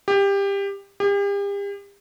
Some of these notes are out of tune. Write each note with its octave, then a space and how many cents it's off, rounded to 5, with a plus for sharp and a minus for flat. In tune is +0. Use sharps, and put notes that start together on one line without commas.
G4 +20
G4 +40